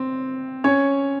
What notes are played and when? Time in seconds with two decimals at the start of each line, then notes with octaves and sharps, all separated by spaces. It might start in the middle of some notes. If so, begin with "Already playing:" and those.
Already playing: C4
0.64 C#4 C#5